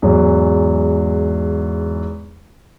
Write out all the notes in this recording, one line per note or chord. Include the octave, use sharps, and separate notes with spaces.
E2 G#2 F#3 G#3